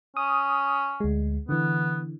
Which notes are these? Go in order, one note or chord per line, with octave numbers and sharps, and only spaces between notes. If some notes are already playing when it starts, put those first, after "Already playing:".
C#4 D#6
D2 G#3
D3 E3 B3